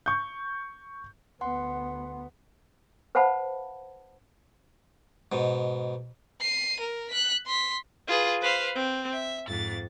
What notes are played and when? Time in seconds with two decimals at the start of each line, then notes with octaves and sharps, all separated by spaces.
0.06 C#6 G6
1.41 D2 B3 F#5 C6
3.15 B4 C5 F5 F#5 A5 B5
5.32 G#2 B2
6.40 C7 D#7
6.80 A#4
7.09 F#6 B6
7.46 C6 B6
8.08 F4 G#4 B4
8.42 B4 C5 F5
8.76 C4
9.15 E5
9.48 F2 G#2 A6